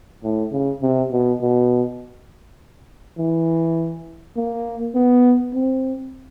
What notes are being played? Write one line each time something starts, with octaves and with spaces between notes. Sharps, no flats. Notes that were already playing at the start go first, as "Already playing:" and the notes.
A2
C#3
C3
B2
B2
E3
A#3
B3
C4